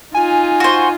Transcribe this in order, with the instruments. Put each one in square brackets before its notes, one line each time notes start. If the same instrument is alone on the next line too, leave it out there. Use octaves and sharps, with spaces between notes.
[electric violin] D#4 F4 [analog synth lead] G#5
[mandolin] F#4 C5